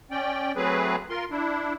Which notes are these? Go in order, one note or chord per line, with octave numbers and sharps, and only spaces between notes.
C#4 D5 G5
F#3 A3 C4 G#4 B4
F4 A#4 C6
D4 E4